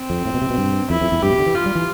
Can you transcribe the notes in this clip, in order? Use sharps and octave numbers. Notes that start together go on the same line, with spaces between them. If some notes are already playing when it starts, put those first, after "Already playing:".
Already playing: C4
F2
A2
B2
C3
B2
G2
F2 E4
F2
E2
G2 G4
B2
D3
E3
F4
G3
E3